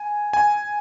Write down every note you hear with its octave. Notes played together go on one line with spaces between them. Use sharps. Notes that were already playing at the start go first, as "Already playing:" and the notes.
Already playing: G#5
G#5